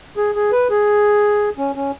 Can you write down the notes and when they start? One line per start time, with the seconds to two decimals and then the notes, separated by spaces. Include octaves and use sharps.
0.17 G#4
0.35 G#4
0.52 B4
0.70 G#4
1.58 C#4
1.75 C#4